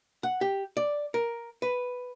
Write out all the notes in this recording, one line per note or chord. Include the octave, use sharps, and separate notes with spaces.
F#5
G4
D5
A#4
B4